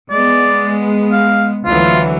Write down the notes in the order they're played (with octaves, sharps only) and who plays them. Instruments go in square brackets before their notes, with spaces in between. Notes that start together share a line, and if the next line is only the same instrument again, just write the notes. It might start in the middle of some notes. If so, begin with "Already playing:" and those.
[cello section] G#3 B3 [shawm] D5
[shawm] F5
[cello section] D2 E3 F#3 [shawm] F4